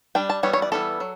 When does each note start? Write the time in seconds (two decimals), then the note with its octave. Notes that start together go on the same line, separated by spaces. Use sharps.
0.15 G3 D4 G5
0.30 A5
0.43 E3 G3 B3 C#5
0.53 C#5
0.62 D5
0.72 E3 G3 B3 A4
1.00 F#3